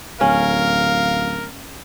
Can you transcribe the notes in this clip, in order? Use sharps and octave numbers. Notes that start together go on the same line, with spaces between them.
D1 C#4 A#4 F5